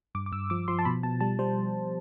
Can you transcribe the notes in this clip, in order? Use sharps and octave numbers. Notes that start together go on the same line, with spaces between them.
G2 D6
D6
G2 E6
F3 D6
F3 C6
A5
B2 B5
B2 A5
G3 A5
G3 C5